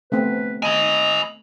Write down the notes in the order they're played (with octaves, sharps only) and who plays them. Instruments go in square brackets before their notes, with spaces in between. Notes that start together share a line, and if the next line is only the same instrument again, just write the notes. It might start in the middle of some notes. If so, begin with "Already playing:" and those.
[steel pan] A3 B3 C4 [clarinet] B4
[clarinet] D#5 [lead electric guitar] G#5 B5